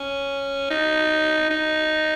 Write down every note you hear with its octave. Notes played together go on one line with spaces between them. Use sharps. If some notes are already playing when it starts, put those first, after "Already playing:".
Already playing: C#4
D#4
D#4